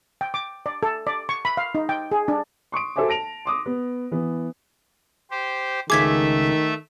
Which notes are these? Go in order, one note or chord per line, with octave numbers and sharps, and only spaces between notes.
G5
D6
D5
A4
D5
C#6
B5
F5
D#4
G5
G#4
D4
C6 C#6 D#6 D7
F#4 A4 C5 E5 G#5 D6
A5 A#6 D7 F7
C6 D6 D#6
B3
E3 B3
G4 C5
C#2 D#3 A3 G#4 E5 D6 G#6 B6